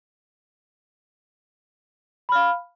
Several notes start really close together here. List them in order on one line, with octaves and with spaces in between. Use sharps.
B5 F6 F5